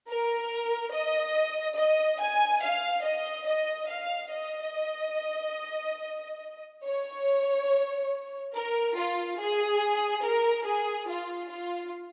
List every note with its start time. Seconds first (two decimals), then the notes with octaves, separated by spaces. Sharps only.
0.10 A#4
0.94 D#5
1.78 D#5
2.21 G#5
2.63 F5
3.05 D#5
3.48 D#5
3.90 F5
4.33 D#5
6.86 C#5
8.55 A#4
8.97 F4
9.40 G#4
10.24 A#4
10.67 G#4
11.10 F4
11.51 F4